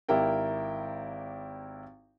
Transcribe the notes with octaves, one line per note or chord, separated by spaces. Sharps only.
G#1 E4 G4 A#4 G5